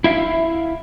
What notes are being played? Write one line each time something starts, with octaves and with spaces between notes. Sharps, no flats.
E4 E5 F5